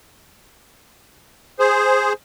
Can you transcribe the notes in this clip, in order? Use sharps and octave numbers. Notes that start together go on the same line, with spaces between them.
G#4 C5